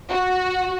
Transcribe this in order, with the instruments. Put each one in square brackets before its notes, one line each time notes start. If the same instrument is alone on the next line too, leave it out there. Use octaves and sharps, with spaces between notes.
[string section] F#4